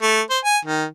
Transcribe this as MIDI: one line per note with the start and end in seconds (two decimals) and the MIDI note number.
0.02 0.22 57
0.30 0.39 72
0.44 0.58 80
0.65 0.85 51